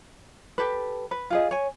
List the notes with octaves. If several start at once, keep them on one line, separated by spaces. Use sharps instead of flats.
G4 A4 B4
B4
F4 G#4 D#5
C#5 G#5